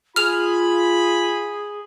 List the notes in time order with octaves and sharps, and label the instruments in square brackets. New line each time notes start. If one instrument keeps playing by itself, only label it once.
[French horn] F4 [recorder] G#4 [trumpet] B5 [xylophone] F6 F7